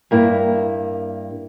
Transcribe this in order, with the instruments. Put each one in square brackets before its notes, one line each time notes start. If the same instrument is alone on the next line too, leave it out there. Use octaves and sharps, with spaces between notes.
[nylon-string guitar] G2 A#3 E4